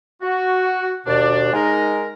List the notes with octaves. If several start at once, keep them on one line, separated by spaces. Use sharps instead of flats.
F#4
D#2 B2 D4 D5
G#3 D#4 A#4